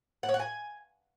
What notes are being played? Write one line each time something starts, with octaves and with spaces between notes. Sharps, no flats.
F#5
C#5
F#5
G#5